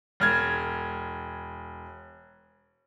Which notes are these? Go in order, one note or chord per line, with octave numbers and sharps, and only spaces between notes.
E1 F6 G#6